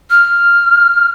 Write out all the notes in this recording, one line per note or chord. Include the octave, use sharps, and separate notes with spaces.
F6